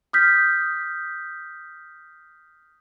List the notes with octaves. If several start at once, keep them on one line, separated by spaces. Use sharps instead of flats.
D#6 F6 G6 B6